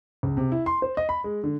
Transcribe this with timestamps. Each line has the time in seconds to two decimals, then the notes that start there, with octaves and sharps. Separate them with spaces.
0.23 C#2
0.37 C3
0.52 E4
0.66 C6
0.82 C5
0.97 D#5
1.09 B5
1.24 G#3
1.43 D3